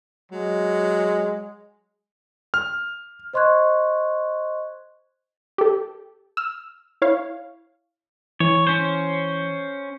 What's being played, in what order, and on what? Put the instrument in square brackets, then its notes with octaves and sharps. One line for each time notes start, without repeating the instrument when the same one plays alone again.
[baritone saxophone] F#3 [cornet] G#3
[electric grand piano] F6
[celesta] C5 D#5 C6 C#6 F#6 G#6
[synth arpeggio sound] G4 A4
E6 F6
E4 C#5 F5
[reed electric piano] E3 [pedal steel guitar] C#5
[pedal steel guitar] C#4 C5